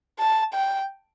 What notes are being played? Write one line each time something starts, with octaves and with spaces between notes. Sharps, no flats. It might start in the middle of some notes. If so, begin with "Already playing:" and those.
A5
G5